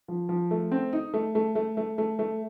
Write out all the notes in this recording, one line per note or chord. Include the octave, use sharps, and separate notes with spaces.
F3
F3
A3
C4
D#4
A3
A3
A3
A3
A3
A3